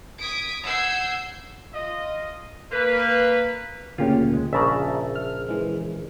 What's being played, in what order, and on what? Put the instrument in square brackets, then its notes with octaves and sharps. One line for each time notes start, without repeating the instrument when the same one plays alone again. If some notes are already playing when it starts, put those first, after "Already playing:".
[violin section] D#6 G#6 B6 D7
F#5 E6 G6 G#6 C7
[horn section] F4 D#5
A#3 B4
[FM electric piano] D2 A#2 C#3 [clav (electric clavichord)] F4 G4 C#5
[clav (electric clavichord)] G#3
[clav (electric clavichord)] A#1 C#3 D5 [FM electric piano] E5 A5 A#5
[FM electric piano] F6
E3 G#3